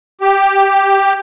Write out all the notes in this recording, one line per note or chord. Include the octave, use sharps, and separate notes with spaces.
G4